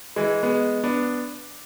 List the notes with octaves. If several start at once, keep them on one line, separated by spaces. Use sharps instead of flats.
E3 G#3
G#3 B3
B3 D4